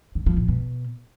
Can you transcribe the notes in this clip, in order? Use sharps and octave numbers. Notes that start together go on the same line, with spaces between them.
D3
F3
A#2
B2